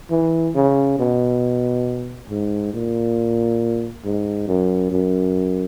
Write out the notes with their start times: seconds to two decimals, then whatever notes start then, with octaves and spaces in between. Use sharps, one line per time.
0.11 E3
0.55 C#3
0.99 B2
2.30 G#2
2.73 A#2
4.05 G#2
4.48 F#2
4.92 F#2